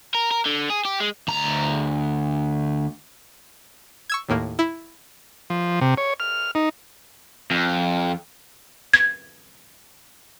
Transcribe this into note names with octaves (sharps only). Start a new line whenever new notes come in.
A#4
A#4
D3
G#4
G4
G#3
D2 A#5
C#6 E6 G#6
D#2 A2 A#3
E4
F3
C3
C#5
F6
D#4
F2
G#6